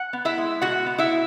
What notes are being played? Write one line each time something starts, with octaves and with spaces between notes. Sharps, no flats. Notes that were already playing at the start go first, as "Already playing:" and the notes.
Already playing: F#5
B3
E4 E5
G#3
B2 F#4 F#5
B3
E4 E5
B2